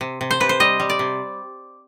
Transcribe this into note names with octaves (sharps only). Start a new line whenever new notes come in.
C3
C3
C5
C3 B4
C5
G3 D#5
G3
D5
C3